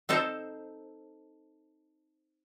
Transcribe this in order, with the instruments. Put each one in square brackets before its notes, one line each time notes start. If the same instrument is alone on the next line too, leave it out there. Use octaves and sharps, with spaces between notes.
[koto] C4 D#4 A4 C5